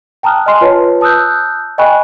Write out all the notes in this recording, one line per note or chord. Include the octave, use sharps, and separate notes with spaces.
G5 A5 A#5 D#6 F6 F#6
D#5 G#5 C6 C7
F4 B4 C#5 A5
A5 D#6 E6 F#6 G6
D#5 G5 G#5 B5 C#6 F#6